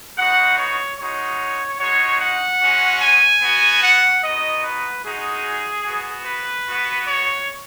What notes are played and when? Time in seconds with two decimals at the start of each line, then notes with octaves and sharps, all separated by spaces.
0.18 G#3 B3 D#4 F#4 F#5
0.58 C#5
0.99 G#3 D#4 F#4 C#5
1.80 G#3 D#4 F#4 C#5
2.21 F#5
2.62 G#3 C#4 F#4
3.02 G#5
3.42 B3 F#4
3.83 F#5
4.23 B3 D#4 F#4 D#5
4.64 B4
5.05 G#3 D#4 F#4 G#4
5.86 B3 F#4
6.26 B4
6.67 B3 F#4
7.08 C#5